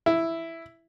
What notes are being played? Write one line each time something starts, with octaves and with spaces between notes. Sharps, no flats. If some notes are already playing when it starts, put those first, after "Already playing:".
E4